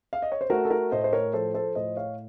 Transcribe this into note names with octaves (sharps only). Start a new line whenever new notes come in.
F5
D#5
C#5
C5
A3 F#4 A#4
A4
F#4 A#4
A2 C5 D#5
C5
A#4 C#5
F3 A4 C5
A4 C5
A2 C5 D#5
C#5 F5